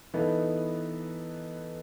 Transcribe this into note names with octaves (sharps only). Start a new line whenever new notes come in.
E3 B3 D#4 A4